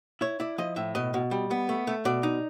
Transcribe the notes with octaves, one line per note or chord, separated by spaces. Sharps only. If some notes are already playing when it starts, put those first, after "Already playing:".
E4 C#5
E4 D5
F3 D#5
A2 E5
B2 D#5
B2
G3
B3
A3
A3
B2 D5
D#4